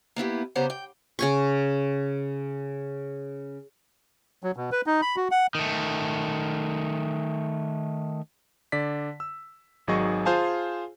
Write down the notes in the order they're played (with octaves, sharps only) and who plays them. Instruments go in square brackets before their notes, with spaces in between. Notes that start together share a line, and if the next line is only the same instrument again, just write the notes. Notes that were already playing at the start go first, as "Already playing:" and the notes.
[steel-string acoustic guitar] A#3 B3 E4 G4
C#3 B3 G4 C5 F#5 A#5
G5
[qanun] C#3 G#5 C#6
[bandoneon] F#3
B2
B4
D#4
B5
F#4
F#5
[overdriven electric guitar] D#3 A3
[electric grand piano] D3 D5 B6
E6
G#1 D#3 F#3 G#4 D#5 C#6
F4 G#4 C5 F5 G#5 A5